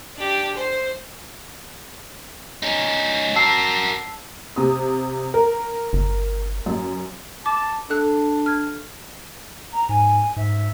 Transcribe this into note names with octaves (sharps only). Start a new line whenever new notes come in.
D4 G4
C5
C#4 D#4
F#4 A#4 A5 E6 C7
C3 D#6
A#4
G1
F#2
A5 D6
D4 A4 F#6
F6 G#6
A#5
G#2 G#5
G#2 E5